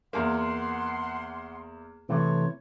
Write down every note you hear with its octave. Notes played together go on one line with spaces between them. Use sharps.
E2 A#3 F#5 C6
C3 E3 A3 C#5